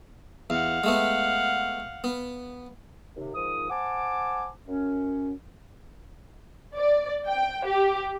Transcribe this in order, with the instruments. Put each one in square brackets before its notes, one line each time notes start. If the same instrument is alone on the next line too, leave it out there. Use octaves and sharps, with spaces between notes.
[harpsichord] E2 [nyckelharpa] F5 F#5
[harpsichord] G#3 A3 B3
B3
[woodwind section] D#2 C3
G#2 D#3 F3 D#6
C5 F#5 G#5 A5 D6
F#2 C#4
[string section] D5
G5
G4